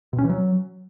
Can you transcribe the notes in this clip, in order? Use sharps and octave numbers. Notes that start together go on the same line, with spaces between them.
B2
C#4
E3
F#3